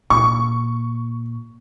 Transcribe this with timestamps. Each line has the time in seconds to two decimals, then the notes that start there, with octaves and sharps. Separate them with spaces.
0.10 A#2 C#6